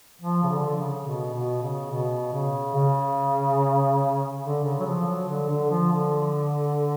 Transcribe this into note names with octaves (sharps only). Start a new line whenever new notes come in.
F3
C#3
D3
C#3
B2
B2
C#3
B2
C#3
C#3
D3
C#3
F#3
F3
F#3
D3
D3
F3
D3